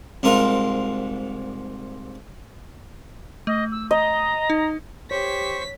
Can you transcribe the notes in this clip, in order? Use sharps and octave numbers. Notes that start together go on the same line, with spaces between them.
C2 G#2 F4 A#4
A3 D#5
E6
D#5 A#5
D#4
G4 C5 C#5 C#6 B6